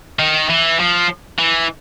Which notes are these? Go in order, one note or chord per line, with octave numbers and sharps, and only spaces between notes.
D#3
E3
F3
E3